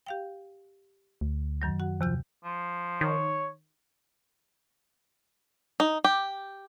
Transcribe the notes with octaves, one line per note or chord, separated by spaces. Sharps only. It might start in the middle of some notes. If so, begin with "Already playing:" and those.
G4 F5 G5
D2
F#2 D#3 F#3
F#4 F#5
D#2 C3 F3 G6
F3
D#3 C#5
D#4
G4